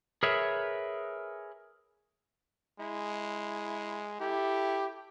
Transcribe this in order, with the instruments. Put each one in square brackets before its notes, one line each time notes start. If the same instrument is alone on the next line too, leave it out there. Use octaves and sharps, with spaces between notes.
[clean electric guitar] G#4 A#4 B4 C#5 E5
[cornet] G#3 [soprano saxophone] E4
[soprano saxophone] E4 [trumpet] G4 [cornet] A4